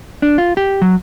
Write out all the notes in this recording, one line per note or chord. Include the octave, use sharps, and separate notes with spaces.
D4
F4
G4
F#3